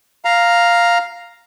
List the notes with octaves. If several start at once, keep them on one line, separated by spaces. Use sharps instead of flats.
F5 A#5